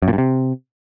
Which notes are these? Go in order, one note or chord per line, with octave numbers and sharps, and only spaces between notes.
F#2
A#2
G2
C3